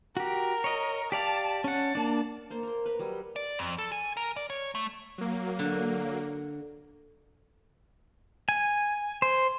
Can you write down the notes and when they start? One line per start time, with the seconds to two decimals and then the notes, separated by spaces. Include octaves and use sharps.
0.17 F#4 G4 A#4
0.64 C#5 D#5
1.12 G4 D5 F5 A5
1.64 C#4 F#5 A5
1.95 A#3 D4
2.50 A#3 C5
2.63 A#4 C6
2.86 A#4 B4
2.99 F#3 G3
3.36 D5
3.59 F2
3.78 A4
3.92 G#5
4.17 A#4
4.36 D5
4.50 C#5
4.75 A3
5.18 F#3 A#3
5.59 D3
8.49 G#5
9.22 C5